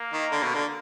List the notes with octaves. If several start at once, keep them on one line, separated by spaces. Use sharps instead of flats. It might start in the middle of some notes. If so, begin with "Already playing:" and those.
Already playing: A#3
D#3
D3
B2
D3